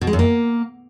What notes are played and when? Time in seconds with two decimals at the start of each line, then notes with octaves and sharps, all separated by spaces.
0.01 B2
0.07 G#3
0.13 F#2
0.19 A#3